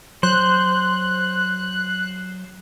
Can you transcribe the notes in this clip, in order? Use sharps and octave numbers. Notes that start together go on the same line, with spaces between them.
F#3 C5 F#6